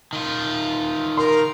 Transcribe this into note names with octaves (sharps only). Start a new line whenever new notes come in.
D#3 F4
A#4 C6